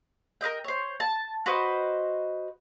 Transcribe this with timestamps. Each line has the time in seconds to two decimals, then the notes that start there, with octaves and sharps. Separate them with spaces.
0.41 A#4 B4 D#5 G5
0.64 C5 C#5
1.00 A5
1.46 F#4 B4 C5 D#5